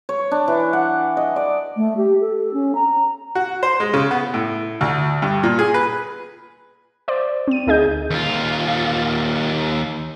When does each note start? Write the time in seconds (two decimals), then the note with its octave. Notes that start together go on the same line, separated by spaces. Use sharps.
0.09 C#5
0.31 D4
0.48 E3
0.73 F#5
1.17 D#5
1.36 D5
1.76 A3
1.97 G4
2.20 A4
2.53 C#4
2.74 A#5
3.35 F#4
3.63 C5
3.80 G#3
3.94 C#3
4.11 B3
4.34 A2
4.81 D2
5.22 G2
5.43 A#2
5.59 G#4
5.74 B4
7.08 C5 D5
7.48 C4 D#7
7.67 D2 D#4 G#4 D#5 G6
8.10 D#2 F4